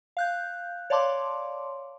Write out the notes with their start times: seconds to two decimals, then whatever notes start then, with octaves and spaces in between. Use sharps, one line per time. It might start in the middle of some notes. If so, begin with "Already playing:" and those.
0.17 F5 F#6 G6
0.90 C#5 D5 F5 A5 C6 D6